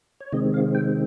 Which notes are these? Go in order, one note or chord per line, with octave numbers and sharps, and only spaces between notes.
C#5
C3 D#3 G#3 C4 D#5
F5
G5